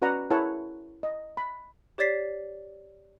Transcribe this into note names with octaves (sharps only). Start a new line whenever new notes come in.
C#4 F#4 B4 D5 F#5 A#5
E4 G#4 A#4 C#5 F#5 A5
D#5
B5
G4 C#5 D5 A6 B6 C7